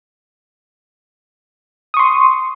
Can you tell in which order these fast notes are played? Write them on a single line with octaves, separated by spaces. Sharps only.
D#6 C#6 C6